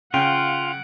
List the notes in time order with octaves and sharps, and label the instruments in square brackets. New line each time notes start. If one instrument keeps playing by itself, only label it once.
[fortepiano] C#3 [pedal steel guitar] F4 [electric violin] F#5 D7 [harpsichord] G5